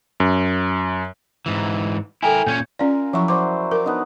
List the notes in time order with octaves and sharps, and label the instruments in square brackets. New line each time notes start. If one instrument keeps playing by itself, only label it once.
[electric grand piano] F#2
[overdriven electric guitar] G#2 E3
[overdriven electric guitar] E4 A#4 [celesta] A4 G5 G#5
[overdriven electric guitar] A#2 C#4 [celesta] G6 G#6
[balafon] C#4 D5 [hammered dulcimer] F4 A#4 G#5
[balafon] F3 C#6 [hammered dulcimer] F#3 E4
[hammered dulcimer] F#4 C5 D5 [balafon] D6
[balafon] A#4 [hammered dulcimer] D6
[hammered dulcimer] B3 D4 D#4